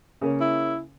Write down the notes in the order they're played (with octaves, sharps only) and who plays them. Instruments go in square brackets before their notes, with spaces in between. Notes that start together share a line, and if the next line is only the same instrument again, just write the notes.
[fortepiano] C#3 A#3 C#4
[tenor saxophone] E4